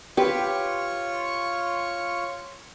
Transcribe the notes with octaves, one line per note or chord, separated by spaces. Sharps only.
F4 G4 B4 C#5 C#6